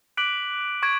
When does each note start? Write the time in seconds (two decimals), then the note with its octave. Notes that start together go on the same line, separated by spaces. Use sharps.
0.17 D6 F#6 B6 D7 F#7
0.83 C#6 G#6 D7